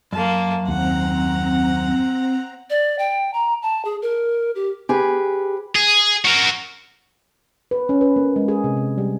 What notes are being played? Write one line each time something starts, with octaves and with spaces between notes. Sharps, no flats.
F#2 A#3 A5
D#2 C4 F#5 A#5
D5
G5
A#5
A5
G#4
A#4
G4
G4 G#4 B4
G#4
F#4 A#4
B4
C#4
B4
A#3
G#3
G#4
C3
C3
G3